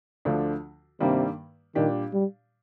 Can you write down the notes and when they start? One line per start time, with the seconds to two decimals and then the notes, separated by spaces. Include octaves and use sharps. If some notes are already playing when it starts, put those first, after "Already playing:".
0.25 D2 D3 F3 A3 D4
1.00 G2 C3 D#3 G3 A#3
1.75 A#2 D#3 G3 D4 G4
2.13 G3